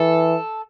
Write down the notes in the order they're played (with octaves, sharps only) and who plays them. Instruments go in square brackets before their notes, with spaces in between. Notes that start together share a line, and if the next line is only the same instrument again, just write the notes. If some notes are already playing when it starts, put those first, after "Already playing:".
Already playing: [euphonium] E3 [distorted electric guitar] A4